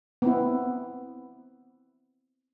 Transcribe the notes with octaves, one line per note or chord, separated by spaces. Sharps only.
B3 C4 E4